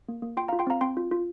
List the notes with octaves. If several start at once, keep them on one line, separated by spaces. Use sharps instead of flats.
A#3
A#3
F4 G5 C6
F5 A#5
F4
G5 C6
C4 F5 A#5
C4 G5 C6
F4
F4